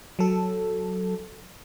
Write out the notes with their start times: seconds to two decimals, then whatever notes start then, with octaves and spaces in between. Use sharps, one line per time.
0.19 F#3 A4